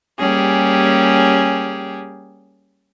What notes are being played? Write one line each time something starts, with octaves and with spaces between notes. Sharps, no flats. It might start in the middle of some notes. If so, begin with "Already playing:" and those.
G3 A#3 C#4 G4 G#4